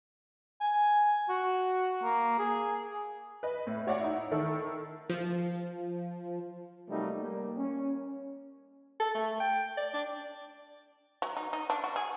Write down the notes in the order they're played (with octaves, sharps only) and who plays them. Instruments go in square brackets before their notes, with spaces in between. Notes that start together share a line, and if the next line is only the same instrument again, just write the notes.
[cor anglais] G#5
F#4
A#3
G#4
[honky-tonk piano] B4 D#5
A2
F#4 C#5 D5 F5 F#5
D#4 E4
D#3 E4 A4
[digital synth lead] F3
[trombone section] C3 F#3 G3 A3 A#3 D#4
G3 A#3
C#4
[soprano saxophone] A4
A3
G5
D5
D4
[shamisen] F#3
D#4
D#4
D4
F#4
G#4